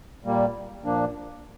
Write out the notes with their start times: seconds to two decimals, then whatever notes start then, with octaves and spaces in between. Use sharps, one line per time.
0.25 A#2 G3 A#3
0.84 A#2 F3 A#3 D4